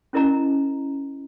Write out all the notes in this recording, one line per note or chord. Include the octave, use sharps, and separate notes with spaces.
C#4 E4 A#4 D#5 A#5